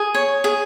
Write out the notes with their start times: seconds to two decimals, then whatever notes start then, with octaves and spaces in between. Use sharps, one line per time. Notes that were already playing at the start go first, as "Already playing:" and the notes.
Already playing: G#4
0.15 C#5
0.44 G#4